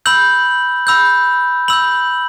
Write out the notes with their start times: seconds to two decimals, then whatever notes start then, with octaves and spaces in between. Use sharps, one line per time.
0.06 B5 E6 G6 F#7
0.87 B5 E6 G6
1.68 B5 E6 G6 F#7